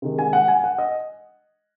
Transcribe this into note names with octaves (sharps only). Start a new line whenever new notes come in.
C3 D#3 G#3
G#5
F#5
G#5
F#5
D#5